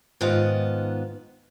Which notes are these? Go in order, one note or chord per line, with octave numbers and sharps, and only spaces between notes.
G#2 D#3 B3 F4 D#5